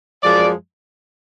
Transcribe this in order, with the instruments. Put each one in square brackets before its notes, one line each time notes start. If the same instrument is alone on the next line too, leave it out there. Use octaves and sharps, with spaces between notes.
[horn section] F#2 F3 G#3 D5